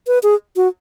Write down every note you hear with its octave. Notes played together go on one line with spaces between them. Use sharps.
B4
G#4
F#4